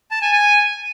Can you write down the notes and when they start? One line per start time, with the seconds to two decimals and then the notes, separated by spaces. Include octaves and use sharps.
0.11 A5
0.21 G#5
0.32 G#5